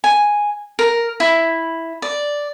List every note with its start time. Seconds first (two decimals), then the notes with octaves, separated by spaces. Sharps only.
0.04 G#5
0.79 A#4
1.20 E4
2.02 D5